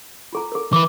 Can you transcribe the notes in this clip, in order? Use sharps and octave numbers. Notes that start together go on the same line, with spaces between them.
F4 A4 A#5
A4 A#4
E3 B4 D6